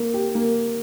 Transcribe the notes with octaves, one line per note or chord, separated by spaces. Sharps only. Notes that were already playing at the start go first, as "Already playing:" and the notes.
Already playing: A#3
G4
A#3